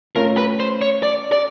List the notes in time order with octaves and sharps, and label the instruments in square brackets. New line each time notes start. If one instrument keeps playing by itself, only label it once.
[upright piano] A3 C#4 F4 [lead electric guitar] A#4
[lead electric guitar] B4
C5
C#5
D5
D5